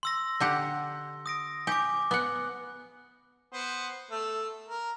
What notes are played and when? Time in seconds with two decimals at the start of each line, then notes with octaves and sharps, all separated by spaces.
0.03 C6 E6 A#6
0.40 D3 G4 F#5
1.26 D#6 A#6 D7
1.67 G4 G#5 D6
2.11 B3 F#5 F#6
3.53 B3 C5
4.11 A3
4.68 A#4